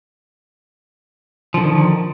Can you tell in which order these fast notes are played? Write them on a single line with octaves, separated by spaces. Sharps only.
F3 D3 D#3